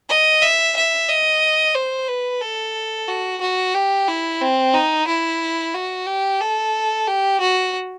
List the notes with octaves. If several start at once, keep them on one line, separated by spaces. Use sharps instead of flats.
D#5
E5
E5
D#5
C5
B4
A4
F#4
F#4
G4
E4
C4
D#4
E4
F#4
G4
A4
G4
F#4